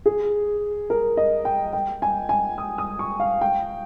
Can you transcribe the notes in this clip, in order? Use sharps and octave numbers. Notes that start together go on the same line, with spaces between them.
G#4
A#4
D#5
G5
G5
G#5
G#5
D#6
D#6
C#6
F5
G5